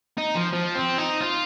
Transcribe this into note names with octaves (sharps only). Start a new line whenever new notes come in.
D#4
F3
F3
C4
D#4
F4